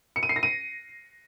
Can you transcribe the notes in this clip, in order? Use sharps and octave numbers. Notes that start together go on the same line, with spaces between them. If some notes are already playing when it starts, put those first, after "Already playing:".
C#7
D#7
C7
A#6
D#7